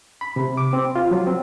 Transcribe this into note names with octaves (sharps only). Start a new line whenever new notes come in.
B5
C3
D6
C4
F4
F#3
C4